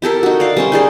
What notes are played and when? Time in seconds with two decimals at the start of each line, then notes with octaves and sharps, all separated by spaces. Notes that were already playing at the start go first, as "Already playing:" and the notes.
0.02 E4 G4 A4 A#4
0.23 D#4 F#4
0.40 D5 F5
0.57 G3 C#4 C5
0.72 D#4 G#4 D5